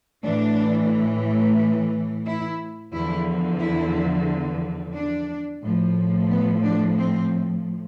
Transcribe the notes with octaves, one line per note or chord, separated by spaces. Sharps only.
A2 E3 D4
E4
E2 D3 F3 E4
E4
D4
A2 F3
B3
D4
C4